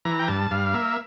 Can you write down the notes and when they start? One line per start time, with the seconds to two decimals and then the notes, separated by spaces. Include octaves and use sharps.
0.05 E3 A#5
0.19 G5
0.28 G2 A5
0.51 G2 F5
0.74 A#3 E5